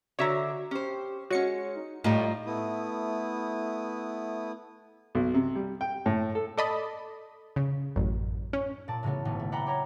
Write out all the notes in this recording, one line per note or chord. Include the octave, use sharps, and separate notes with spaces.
D3 F#4 C#5 D5 E5 A#5
C#4 G4 C5
G#3 C#4 F#4 C#5 C#7
D#4
A2 G3 A3 D#4 F4
A3 B3 E4 D#6
B1
C3
G3
G5
A2
A4
A4 D5 D#5 A5 B5
C#3
A1 F#2
C#4
A#2 D5 A5
A2 C#3 F#3 A3 B3
D#1 G#1 B3
A3
D5 E5 F#5 G5 A#5 B5
G4 C#5 A#5